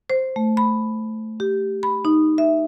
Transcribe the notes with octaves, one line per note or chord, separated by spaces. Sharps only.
C5
A3
B5
G4
B5
D#4
E5